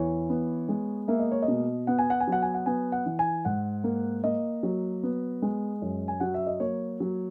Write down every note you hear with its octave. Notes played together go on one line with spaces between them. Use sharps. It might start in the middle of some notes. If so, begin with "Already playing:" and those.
Already playing: E2 E3 C#5
B3
G#3
A#3 E5
D#5
C#5
D#5
B2
B3 F#5
G#5
F#5
G#5
F#3 F#5
G#5
F#5
B3 G#5
F#5
E3
G#5
G#2 F#5
A#3
A#3 D#5
F#3
B3
G#3
F#2
G#5
F#3 F#5
E5
D#5
A#3 C#5
F#3